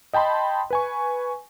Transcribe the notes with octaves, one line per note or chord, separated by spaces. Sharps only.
D#5 G5 A5 B5 C6
B4 G#5 C#6